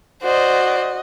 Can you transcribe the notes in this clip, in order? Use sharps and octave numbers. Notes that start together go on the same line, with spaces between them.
F#4 C5 D5 D#5